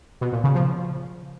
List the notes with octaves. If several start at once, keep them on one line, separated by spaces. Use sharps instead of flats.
B2
A#2
C#3
F3